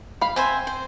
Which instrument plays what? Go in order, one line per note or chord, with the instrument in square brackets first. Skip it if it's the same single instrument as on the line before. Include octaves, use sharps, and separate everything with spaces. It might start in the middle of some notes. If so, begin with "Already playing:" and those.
[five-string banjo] F5 B5
[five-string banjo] C4 [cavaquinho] C5 E5 G#5
[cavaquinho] C5